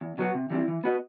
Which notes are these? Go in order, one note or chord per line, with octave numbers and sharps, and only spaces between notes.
E2
B2 F#3 B3 F#4
C3
E3 G3 C4 E4
E3
B3 F#4 B4 D#5